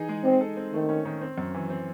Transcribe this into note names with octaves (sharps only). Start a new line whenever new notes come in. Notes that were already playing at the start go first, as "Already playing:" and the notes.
Already playing: E3 D#4 G#4
G#3
C4 D#4
A4
C4
D#3 A3
C#4
D#3
C4
F#2
E3
C4